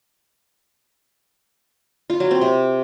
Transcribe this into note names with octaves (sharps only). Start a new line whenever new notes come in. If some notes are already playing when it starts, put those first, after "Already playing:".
F4
F#3
C4
C3